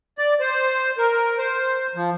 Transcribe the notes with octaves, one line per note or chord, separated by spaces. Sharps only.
D5
C5
A#4
C5
F3